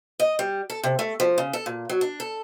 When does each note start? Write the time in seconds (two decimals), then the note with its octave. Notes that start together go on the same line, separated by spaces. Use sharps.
0.20 D#5
0.39 G3
0.70 A4
0.83 C3
0.99 A3
1.20 F3
1.38 C#3
1.53 A4
1.66 A#2
1.89 F#3
2.01 D4
2.20 A4